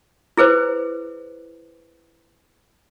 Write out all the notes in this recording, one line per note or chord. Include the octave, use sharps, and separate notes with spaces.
E4 G#4 B4 C5